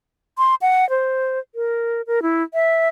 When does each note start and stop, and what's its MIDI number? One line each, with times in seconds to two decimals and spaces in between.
0.38 0.55 84
0.62 0.88 78
0.90 1.39 72
1.55 2.02 70
2.07 2.22 70
2.22 2.43 64
2.54 2.89 76